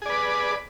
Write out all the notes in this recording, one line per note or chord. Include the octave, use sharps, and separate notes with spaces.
G#4 B4 D5